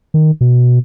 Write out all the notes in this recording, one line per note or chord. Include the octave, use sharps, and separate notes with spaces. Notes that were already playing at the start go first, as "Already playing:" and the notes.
D#3
B2